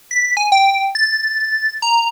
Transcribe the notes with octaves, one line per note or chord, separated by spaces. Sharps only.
B6
G#5
G5
A6
A#5